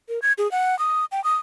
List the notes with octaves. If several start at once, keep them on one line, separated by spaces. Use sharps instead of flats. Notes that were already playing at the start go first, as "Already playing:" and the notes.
A#4
G#6
G#4
F#5
D#6
G5
D#6